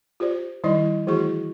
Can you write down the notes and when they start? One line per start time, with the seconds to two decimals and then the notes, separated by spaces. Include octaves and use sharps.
0.20 F4 G4 C5 D5
0.64 D#3 G3 D#4 E4 D5 D#5
1.07 E3 A3 E4 F#4 G#4 C#6